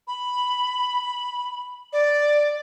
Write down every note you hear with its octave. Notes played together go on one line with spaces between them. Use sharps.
B5
D5